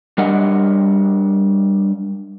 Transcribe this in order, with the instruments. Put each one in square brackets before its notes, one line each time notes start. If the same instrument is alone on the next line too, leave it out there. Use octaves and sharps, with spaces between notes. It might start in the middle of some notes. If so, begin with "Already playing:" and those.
[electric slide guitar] G3 D4 A#4 D#5 F#5